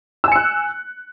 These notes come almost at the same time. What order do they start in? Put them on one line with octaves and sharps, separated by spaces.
E6 G#5 C#7 F#6